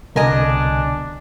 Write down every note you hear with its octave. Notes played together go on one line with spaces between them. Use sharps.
C2 B2 D3 D4 A#4 D#5 G#5